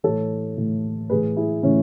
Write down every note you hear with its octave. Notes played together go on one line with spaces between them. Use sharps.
A2 E3 A4 C#5
A2 E3
A2 E3 G#4 B4
E4 G#4
A2 E3 C#4 E4